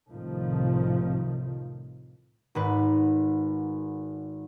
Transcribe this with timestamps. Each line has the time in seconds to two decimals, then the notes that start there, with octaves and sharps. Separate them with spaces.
0.11 C2 A2 C3 D#3 F3
2.55 G#1 G#2 B4